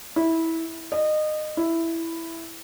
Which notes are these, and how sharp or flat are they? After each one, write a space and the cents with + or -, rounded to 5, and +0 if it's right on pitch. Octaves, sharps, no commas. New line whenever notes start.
E4 -15
D#5 -25
E4 +5